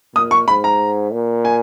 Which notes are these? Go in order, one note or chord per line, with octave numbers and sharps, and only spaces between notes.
A#2 D#6
C#6
G#2 B5
A#5
A#2
G#5